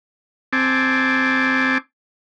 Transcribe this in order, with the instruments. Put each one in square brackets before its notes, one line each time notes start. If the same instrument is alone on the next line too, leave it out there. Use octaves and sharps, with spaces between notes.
[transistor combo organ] C4 G#5 A5 D6